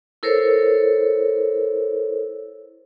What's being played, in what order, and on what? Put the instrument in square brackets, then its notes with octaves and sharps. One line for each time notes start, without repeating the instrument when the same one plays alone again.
[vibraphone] E4 A4 A#4 C5 C#5